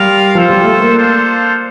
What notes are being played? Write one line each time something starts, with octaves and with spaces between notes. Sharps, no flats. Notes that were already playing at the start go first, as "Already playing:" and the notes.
Already playing: G3 F4 A#4 F5
F3 F4 A4 C5
G3
A3
A#3
D4 F4 A4 C5